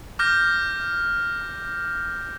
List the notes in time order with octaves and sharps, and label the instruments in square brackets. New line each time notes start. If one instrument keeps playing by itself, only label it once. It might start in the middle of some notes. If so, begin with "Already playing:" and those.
[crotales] D6 F6 G6 A#6